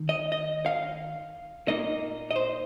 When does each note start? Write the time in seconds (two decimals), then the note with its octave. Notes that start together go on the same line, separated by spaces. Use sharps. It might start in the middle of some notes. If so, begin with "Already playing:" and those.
Already playing: D#3
0.09 D#5
0.32 D#5
0.66 F5
1.68 A#2 A#3 D#4 D#5
2.31 D#5
2.36 C5